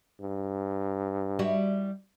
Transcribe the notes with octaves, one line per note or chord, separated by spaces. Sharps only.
G2
G3 E4 F#4